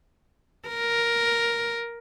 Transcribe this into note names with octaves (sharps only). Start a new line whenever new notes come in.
A#4